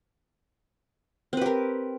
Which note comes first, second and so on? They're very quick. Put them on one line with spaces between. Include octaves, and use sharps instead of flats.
C4 B4 G4 A#4